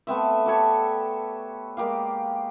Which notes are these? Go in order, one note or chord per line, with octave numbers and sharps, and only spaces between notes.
A3 B3 C4 E5
G4 A4 C#5 D5
G#3 A#3 G4 F5